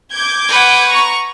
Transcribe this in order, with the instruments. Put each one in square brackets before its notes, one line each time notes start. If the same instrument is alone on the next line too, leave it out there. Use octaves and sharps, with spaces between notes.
[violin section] D6 G6 G#6
[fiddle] B4 F#5
[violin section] A#5 C#6